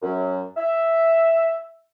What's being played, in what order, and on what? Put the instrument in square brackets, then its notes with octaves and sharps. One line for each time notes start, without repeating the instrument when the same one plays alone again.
[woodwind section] F#2
E5